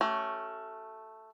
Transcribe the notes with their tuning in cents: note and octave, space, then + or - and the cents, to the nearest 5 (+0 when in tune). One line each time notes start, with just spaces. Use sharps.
A3 +0 C#4 +0 F#4 +45